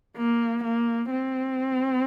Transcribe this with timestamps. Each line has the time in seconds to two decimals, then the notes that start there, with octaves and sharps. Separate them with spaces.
0.17 A#3
0.64 A#3
1.11 C4